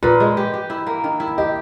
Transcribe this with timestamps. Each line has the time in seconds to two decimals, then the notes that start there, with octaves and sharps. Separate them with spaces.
0.03 A#2 B4
0.20 G#3
0.37 G4
0.54 G4
0.70 E4
0.87 A#3
1.04 D#3
1.20 E4
1.38 G4 D#5